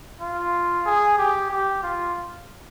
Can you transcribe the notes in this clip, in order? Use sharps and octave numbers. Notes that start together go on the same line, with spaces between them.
F4
G#4
G4
G4
F4